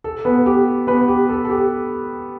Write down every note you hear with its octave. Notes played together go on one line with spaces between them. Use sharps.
A4
B3 B4
G4
B3 B4
G4
A4
A4
G4